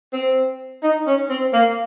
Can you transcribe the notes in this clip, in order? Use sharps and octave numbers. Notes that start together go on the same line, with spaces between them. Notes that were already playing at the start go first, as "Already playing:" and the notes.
C4
D#4
C#4
C4
A#3